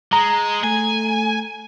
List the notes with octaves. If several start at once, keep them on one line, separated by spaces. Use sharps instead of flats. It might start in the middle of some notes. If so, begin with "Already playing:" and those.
G#3 A#5
A3 G#5